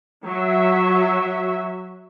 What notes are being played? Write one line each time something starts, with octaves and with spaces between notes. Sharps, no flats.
F#3 E5